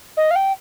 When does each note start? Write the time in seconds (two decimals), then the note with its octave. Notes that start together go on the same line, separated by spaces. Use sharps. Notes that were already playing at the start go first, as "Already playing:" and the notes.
0.17 D#5
0.31 F5
0.36 G5